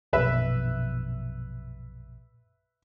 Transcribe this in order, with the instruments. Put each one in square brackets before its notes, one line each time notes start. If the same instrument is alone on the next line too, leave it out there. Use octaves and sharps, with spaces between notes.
[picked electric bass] A#1 F#2 B2 [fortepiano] B4 E5